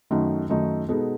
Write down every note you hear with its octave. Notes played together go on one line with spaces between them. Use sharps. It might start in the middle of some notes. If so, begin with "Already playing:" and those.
F#2 D#3 A3 D#4
F#2 D#3 A3 D#4
B2 G#3 B3 D#4 A4